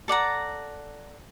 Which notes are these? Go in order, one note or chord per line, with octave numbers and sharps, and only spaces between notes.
A4 D5 F#5 A#5